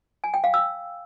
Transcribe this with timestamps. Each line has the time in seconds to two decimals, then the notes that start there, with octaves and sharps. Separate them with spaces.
0.24 G#5
0.34 G5
0.44 F5
0.54 E6